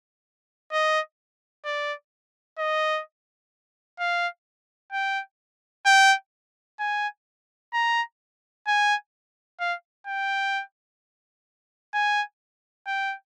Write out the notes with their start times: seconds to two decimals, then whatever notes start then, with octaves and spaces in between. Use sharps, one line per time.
0.72 D#5
1.65 D5
2.59 D#5
3.99 F5
4.93 G5
5.86 G5
6.79 G#5
7.73 A#5
8.67 G#5
9.60 F5
10.07 G5
11.94 G#5
12.87 G5